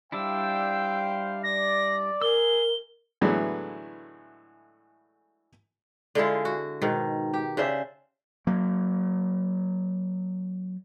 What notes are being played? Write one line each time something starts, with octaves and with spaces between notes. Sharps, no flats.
G3 D4 E4 C5 F5 G5 E6
D5 A#6
G#4 A#4 E6 G7
A2 D3 E3 F#3 G#3 B3
D3 G#3 E4 F4
F#4
G#2 B2 D#3
G4
C#3 D4 C5 E5
F#3 A#3